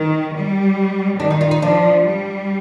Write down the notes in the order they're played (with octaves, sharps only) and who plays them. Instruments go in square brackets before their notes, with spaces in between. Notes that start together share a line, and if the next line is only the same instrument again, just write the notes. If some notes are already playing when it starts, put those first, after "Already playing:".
Already playing: [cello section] D#3
G3
[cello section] D#3 [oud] D4
[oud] D#4
F4
D#4
[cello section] F3 [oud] D4
[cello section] G3